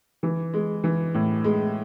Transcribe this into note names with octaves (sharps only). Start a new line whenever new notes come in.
E3
G#3
E3
A2
G#3